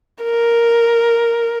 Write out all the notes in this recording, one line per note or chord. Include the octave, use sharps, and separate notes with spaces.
A#4